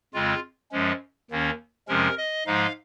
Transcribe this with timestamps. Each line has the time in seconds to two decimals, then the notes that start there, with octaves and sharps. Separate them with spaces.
0.14 F2 C#3 G#3 C4 F4
0.72 F#2 F3 G#3 C#4
1.30 D#2 D#3 A#3 C#4
1.88 F2 C3 F3 G#3 C#4 A#4
2.17 D#5
2.46 G#2 F3 G#3 D#4 F5